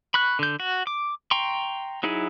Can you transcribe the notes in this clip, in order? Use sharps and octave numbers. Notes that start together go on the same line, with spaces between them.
B5 C#6 F#6
D3 G6
F#4
D6
G5 A#5 C6 C#6
F#3 D#4 E4 G#4